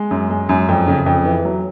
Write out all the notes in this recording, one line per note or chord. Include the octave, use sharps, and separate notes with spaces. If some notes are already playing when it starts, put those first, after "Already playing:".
Already playing: G#3
F#2
G#3
F#2
F2
C#3
F2
E3
F#3